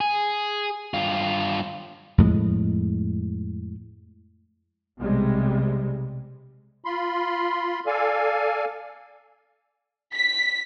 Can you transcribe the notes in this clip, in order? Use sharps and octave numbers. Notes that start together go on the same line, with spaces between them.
G#4
G2 F4
F2 A2 G#3
B1 C3 G3 G#3
F4 B5 C6
A4 D5 F5 G#5
B6